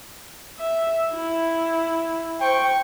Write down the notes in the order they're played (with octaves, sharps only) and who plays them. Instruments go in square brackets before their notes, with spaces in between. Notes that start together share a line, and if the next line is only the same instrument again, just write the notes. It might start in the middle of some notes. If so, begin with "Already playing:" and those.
[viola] E5
E4
[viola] C5 C#6 [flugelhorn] G5